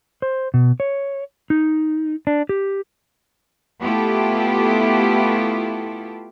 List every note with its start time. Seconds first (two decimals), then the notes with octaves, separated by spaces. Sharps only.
0.22 C5
0.54 B2
0.80 C#5
1.50 D#4
2.27 D4
2.49 G4
3.81 A3 B3 E4 F4 G4 A4